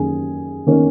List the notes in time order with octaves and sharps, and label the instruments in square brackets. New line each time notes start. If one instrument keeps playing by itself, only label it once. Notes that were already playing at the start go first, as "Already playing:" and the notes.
Already playing: [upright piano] F#2 D#3 A#3 C#4 G#4 G#5
D#3 A#3 C#4